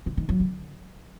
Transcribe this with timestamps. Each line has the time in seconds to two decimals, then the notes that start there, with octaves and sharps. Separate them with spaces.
0.06 C#3
0.17 D#3
0.29 F#3
0.40 D3